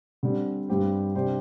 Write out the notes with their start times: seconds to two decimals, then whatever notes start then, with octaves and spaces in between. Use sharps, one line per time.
0.23 D3 G3 C4
0.69 G2 G3 C4 G4 C5
1.15 C3 G3 D4 G4 C5